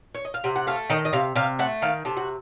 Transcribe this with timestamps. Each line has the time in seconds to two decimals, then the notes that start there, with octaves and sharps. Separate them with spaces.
0.15 C#5
0.25 D#5
0.34 F5
0.44 C3 F#5
0.56 F#5
0.67 A3 F5
0.90 D#3 D#5
1.05 D#5
1.13 C3 F5
1.36 C3 F5
1.59 A3 F#5
1.82 D#3 F5
2.05 C3 A4
2.17 F#4